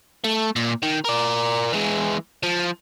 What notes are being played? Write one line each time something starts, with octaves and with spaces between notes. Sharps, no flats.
A3
A#2
D#3
A#4 D5
E3 G#3
F3